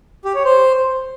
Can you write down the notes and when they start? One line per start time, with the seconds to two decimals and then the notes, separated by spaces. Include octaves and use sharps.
0.25 G4
0.35 C#5
0.45 C5